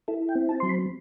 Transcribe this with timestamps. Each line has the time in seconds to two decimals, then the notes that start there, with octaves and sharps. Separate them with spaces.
0.08 E4 A4
0.29 G5
0.35 C4
0.49 A5
0.60 F#3 C6
0.69 B5